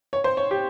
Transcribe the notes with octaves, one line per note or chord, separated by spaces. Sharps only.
C#5
C5
C#5
G4